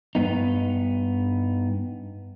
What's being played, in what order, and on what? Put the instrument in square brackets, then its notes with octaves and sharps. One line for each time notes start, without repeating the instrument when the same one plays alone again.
[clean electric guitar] G2 B3 D#4